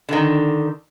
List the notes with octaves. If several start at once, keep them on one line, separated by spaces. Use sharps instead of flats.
D3 D#3